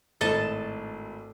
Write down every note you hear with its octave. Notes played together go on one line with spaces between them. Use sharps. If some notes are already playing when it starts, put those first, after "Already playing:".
G#1 A2 A4 D#5 A5